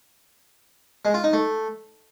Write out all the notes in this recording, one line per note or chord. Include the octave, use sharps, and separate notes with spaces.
G#3
F4
D#4
A3